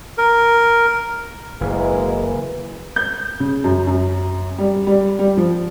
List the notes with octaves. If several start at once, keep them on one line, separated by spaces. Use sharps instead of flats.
A#4
F#1 E3 G#3 A#3 E4
G6
C#3
F#2
F#2
G3
G3
G3
F3